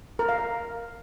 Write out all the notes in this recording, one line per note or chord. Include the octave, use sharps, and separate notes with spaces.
A#4
F5
A#4